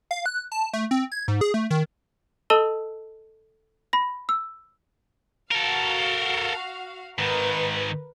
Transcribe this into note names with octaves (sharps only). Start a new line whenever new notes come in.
F5
F#6
A5
A3
C4
G#6
G#2
G#4
A3
D#3
A4 D#5 A5 E6 D#7 G7
B5 A#6
E6
F#4 A4 A#4 F5
G#2 D#3 A#4 B4